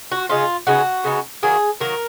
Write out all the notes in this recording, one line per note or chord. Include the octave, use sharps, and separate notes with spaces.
F#4
C#3 G#3 D#4 F4
C#3 G#3 B3 D#4 F#4
C#3 G#3 B3 D#4
D#3 F#3 A#3 G#4
D#3 F#3 A#3 A#4